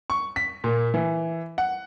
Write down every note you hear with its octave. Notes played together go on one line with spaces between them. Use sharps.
C#6
B6
A#2
E3
F#5